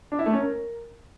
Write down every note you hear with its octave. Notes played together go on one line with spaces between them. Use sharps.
D4
E4
A3
C#4
A#4